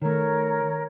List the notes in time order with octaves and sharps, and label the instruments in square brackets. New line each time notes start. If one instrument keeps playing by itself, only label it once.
[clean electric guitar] D#3 A3 [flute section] A#4 C#5 A#5